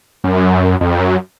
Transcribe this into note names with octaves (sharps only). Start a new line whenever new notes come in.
F#2
F2
F#2